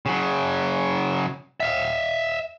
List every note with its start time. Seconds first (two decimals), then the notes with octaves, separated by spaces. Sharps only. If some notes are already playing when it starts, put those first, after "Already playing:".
0.06 C#3 F#3
1.60 E5 F5